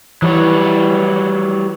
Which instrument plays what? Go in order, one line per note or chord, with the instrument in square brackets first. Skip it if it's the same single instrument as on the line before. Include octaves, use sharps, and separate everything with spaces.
[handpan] E3 [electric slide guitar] F#3 G3 C#5